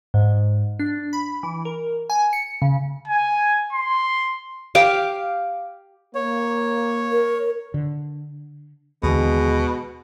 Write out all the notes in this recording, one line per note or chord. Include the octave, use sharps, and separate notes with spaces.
G#2
D4
B5
E3
A#4
G#5
C#7
C#3
G#5
C6
G4 F5 D6
A#3 C#5
A#4
D3
D#2 B2 D3 E3 G#3